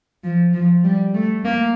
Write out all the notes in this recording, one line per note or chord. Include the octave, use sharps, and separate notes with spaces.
F3
F3
G3
A3
A#3